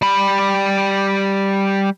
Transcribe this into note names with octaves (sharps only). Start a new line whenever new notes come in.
G3 B5